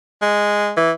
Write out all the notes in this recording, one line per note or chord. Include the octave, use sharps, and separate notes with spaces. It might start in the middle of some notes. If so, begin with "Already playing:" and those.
G#3
E3